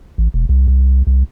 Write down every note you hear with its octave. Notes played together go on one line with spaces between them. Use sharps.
A1
E1
C2
C2
C2